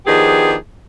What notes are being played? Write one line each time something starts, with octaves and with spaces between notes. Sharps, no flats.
D#3 F3 B3 D4 G4 G#4